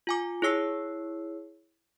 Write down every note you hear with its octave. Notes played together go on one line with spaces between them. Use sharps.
F4 G#5 D6
E4 G#4 C#5 E6 C7